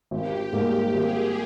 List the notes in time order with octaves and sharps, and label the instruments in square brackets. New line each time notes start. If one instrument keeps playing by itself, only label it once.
[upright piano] G#1 [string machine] G4
[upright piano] G#2 G3 A#3
[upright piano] G#1 [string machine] G#4